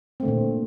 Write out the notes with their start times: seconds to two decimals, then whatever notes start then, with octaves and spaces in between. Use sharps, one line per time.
0.20 C4
0.23 A3
0.25 D3
0.28 A#2